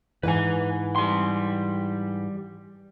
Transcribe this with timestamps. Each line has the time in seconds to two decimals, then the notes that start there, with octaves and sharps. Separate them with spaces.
0.23 G#2 E3 B4 G#5
0.96 G3 C6